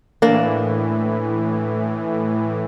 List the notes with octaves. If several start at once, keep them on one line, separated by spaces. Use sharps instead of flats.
A2 E3 A#3 D4